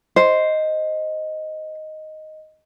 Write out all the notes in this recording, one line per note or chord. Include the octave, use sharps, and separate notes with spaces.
C5 D#5